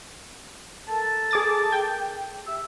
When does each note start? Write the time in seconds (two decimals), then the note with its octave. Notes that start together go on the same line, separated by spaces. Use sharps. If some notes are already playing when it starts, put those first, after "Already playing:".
0.88 A4 A#4 A5
1.31 G#4 D6 A6
1.72 G5
2.46 G4 E5 E6